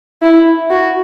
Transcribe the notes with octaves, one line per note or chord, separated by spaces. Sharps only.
E4
F#4